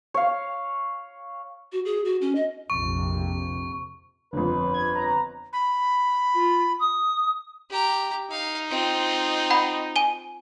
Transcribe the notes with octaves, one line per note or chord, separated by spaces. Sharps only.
C#5 F5
F#4
G#4
F#4
C#4
D#5
A#1 F2 C3 C#6
G1 F2 B4
G#6
A#5
B5
F4
D#6
G4 A#5
D#4 F5
C4 F4
F#5 B5
G#5 D#7 G7